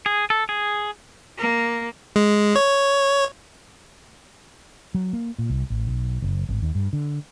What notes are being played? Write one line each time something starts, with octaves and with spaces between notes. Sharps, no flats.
G#4
A4
G#4
A#3
G#3
C#5
F#3
A#3
A#2
C2
A1
B1
F#1
G#1
D#2
G2
D3